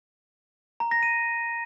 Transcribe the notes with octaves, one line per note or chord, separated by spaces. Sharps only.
A#5
A#6
D#7